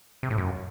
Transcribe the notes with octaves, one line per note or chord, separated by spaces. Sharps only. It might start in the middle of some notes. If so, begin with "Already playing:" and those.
C3
A2
F#2